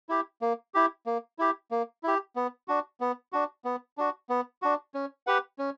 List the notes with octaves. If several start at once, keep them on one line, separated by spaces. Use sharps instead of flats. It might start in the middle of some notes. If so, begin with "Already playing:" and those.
E4 G4
A#3
E4 G4
A#3
E4 G4
A#3
E4 G4
B3
D4 F#4
B3
D4 F#4
B3
D4 F#4
B3
D4 F#4
C#4
G4 B4 F#5
C#4